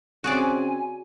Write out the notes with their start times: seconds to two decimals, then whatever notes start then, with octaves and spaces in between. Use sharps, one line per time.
0.24 C#3 C4 F#4 G#4 D5 G#5